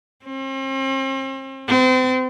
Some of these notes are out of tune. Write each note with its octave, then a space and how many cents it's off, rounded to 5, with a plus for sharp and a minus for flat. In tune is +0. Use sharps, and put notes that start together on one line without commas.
C4 +40
C4 -35